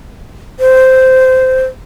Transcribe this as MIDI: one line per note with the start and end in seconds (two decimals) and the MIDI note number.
0.60 1.65 72